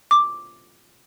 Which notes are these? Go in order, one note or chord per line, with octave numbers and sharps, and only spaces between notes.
D6